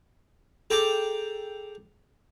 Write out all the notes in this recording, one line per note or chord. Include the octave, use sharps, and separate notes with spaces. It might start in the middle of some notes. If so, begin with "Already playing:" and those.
G#4 A4 G5 A#5 D6